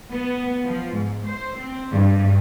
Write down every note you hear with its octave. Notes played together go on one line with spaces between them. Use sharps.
B3
F3
G#2
C5
C4
G2